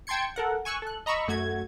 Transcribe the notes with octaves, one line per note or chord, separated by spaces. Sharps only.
G5 A5 C6 G#6 C#7
A4 A#4 F#5
G#5 C#6 E6 F#6
A4 F#6
D#5 A#5 B5 C#6 E6
F#2 A3 F#4 G#6